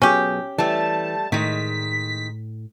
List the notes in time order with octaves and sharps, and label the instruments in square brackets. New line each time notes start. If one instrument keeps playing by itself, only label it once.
[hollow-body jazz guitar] B2 F#3 G#4 [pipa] C#4 G4
[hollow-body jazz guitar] E3 [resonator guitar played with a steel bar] G3 A3 [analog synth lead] A5
[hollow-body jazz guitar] A2 [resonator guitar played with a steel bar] D#3 G#3 [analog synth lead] B6